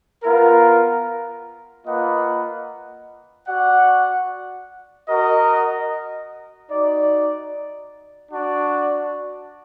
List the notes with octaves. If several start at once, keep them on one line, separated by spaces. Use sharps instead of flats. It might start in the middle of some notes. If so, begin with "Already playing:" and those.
B3 F4 A#4
A#3 F4 B4 D#5 F#5
F#4 D5 F#5
F#4 A#4 D#5
D#4 F#4 D5
D4 F#4 D5